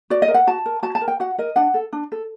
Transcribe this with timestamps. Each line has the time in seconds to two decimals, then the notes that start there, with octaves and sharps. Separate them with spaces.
0.10 F#4 D5
0.22 D#5
0.28 A#4
0.34 F#5
0.47 F#4 A5
0.66 A#4
0.83 F#4 A5
0.95 A5
1.01 A#4
1.08 G5
1.20 F#4 F#5
1.38 A#4 D#5
1.56 D4 F#5
1.74 A4
1.93 D4
2.12 A4